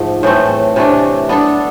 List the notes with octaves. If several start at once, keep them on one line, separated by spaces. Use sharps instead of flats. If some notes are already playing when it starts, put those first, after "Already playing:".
Already playing: G#2 F3 A3
A2 E3 A3 C4
C3 E3 A3 D4
B3 D4 A4